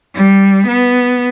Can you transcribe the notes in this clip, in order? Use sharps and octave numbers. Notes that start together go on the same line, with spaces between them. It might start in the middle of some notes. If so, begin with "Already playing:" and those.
G3
B3